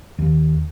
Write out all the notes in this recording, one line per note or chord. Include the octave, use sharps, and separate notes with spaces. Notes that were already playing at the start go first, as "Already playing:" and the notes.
D#2